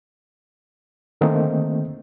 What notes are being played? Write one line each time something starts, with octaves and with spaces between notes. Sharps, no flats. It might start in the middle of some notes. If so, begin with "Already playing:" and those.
D3 D#3 A3 A#3 C4 D#4